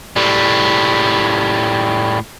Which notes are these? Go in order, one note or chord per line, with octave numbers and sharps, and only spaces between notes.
A2 G3